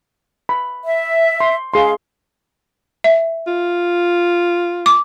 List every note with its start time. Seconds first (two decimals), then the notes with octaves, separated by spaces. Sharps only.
0.49 B5
0.85 E5
1.41 C6
1.74 G#4 F5 C6
3.04 E5
3.47 F4
4.86 D6